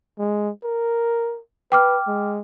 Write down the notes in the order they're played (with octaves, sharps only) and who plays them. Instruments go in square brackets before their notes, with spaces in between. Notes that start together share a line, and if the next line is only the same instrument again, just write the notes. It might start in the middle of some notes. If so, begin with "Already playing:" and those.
[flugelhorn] G#3
A#4
[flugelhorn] B4 [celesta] G5 D6 F6
[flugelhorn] G#3